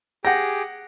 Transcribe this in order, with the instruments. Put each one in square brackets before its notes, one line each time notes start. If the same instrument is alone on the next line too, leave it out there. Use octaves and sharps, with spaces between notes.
[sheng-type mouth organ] G4 G#4 G5 [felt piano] F#5 A#6